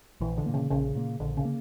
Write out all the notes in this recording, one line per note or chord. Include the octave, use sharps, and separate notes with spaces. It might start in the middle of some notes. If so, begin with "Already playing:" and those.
A#1 E3
D3
A#2 A#3
C#3
A#1 C#3
A#2 A#3
A#1 D3
C#3
A#3